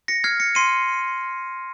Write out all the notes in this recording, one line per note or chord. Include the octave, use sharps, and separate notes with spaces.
A#6 C#7
F6 G#6 C7
A#6 C#7
C6 C7 D#7